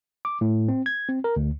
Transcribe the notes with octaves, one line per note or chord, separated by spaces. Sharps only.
D6
A2
C4
G#6
C4
A#4
D2